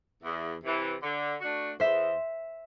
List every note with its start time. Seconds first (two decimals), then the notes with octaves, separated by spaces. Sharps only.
0.23 E2
0.63 C3 E3
1.02 D3
1.41 A3 D4 F#4
1.80 E2 C5 E5